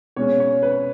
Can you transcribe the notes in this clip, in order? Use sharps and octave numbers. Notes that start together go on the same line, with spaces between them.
B2 G#3 C#4 C#5
C#5
B4